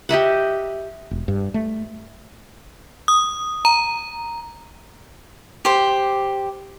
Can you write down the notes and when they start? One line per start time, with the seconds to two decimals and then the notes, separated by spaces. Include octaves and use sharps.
0.09 G4 D#5 E5 F#5
1.11 E1
1.28 G2
1.54 A3
3.08 D#6
3.65 A#5
5.65 G4 C5